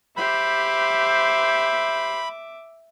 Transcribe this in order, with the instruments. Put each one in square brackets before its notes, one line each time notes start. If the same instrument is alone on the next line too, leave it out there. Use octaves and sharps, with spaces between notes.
[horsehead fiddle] G4 C5 [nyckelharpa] E5 D6 [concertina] B5